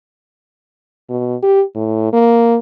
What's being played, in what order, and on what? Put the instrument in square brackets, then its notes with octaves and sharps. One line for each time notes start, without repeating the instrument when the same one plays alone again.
[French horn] B2
G4
A2
A#3